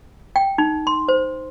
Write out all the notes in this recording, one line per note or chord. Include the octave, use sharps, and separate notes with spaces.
G5
D#4
C6
C5